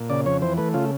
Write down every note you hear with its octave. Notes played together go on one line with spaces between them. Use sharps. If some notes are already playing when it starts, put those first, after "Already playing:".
Already playing: A#2
C#3 D5
F2 C#5
E3 C5
A3 B4
C#3 F4